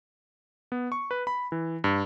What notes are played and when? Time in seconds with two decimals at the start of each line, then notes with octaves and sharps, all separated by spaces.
0.72 B3
0.92 C#6
1.11 B4
1.27 B5
1.52 E3
1.84 G2